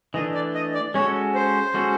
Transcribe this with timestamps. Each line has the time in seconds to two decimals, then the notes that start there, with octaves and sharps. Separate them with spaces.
0.14 E3 A3 D4 D#5
0.34 D5
0.55 D#5
0.74 D5
0.94 G#3 C#4 F#4 A4 C#5
1.35 C5
1.74 G#3 C#4 F#4 A4